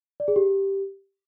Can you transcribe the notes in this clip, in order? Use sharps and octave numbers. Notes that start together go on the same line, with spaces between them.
D5
G#4
G4